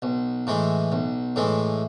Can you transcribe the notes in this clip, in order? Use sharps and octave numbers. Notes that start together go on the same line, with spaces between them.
B1
A2 E3 G#3
B1
A2 E3 G#3